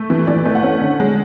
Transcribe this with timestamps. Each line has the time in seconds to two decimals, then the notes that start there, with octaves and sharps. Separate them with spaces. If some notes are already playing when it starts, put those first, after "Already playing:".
Already playing: A3
0.10 E3
0.27 E3 D5
0.45 A3
0.55 F#5
0.63 C#4
0.81 D3
1.00 G#3